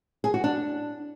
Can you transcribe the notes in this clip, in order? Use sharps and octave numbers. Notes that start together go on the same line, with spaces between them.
G#4
F#4
D4